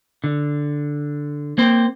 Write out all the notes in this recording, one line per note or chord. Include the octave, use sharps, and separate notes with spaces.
D3
A#3 C4 C5